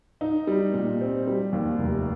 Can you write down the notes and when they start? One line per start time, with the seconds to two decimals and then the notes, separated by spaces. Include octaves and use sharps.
0.21 D#4
0.47 G3
0.74 A#2
1.01 C4
1.27 G3
1.52 D#2
1.79 F1